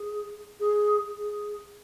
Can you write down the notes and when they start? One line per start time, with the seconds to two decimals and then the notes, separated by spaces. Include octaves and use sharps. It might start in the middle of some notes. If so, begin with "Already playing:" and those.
Already playing: G#4
0.60 G#4
1.18 G#4